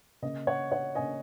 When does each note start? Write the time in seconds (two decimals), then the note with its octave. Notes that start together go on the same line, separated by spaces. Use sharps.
0.22 C#3 A#3 C#4 D#5
0.47 C#5 F#5
0.71 C#5 F#5
0.95 C#3 A#3 C#4 D#5 G#5